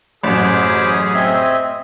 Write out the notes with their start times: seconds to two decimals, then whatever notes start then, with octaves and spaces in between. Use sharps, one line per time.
0.23 A1 F#2 C#4 G#4 C5 B5 D6
1.14 C4 D#5 E5